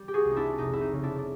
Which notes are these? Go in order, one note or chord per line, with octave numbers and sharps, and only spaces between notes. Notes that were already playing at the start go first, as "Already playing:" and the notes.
Already playing: G3
G4
F#4 G#4
C2
D#4
D4 E4
F1 D#4
E4
D#4
C#3
D4 E4
D4